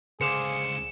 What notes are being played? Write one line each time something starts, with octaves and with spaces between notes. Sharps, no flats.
C#2 D3 G#4 C5 F5 D6 C#7 E7